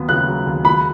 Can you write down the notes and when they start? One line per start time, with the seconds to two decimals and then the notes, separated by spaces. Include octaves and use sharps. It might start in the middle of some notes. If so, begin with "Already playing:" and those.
Already playing: D#2 F#3 B3
0.09 C#3 F#6
0.27 F#3
0.47 D#2
0.65 G#3 B5